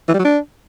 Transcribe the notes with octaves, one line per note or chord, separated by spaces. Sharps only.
E3
G3
F#3
D4